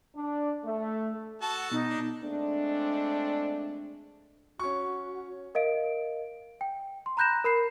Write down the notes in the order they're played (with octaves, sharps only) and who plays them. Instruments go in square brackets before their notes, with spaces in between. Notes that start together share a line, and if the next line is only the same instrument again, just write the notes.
[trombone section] D4
A3
[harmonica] F#4 A4 A5
[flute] F#5
[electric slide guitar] B2 [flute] D#4
[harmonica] D4
[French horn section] G#3 A3 C4 D4
[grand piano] C#4 C#6 [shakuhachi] F#4
[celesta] A#4 D#5 F5 D7
G5
C6
A#5 B5 F#6 G6 A#6 E7
A#4 B5 C7 E7